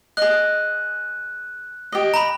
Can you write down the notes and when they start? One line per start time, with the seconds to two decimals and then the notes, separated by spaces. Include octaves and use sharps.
0.17 G#4 D#5 F#6
1.92 G4 D#5
2.14 A#5 B5